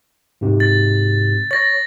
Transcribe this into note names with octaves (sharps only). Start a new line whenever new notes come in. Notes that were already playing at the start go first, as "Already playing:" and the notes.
G#2 C3
A6
C#5 A6 A#6